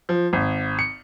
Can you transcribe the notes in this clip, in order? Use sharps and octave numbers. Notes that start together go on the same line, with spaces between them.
F3
G#1
C#7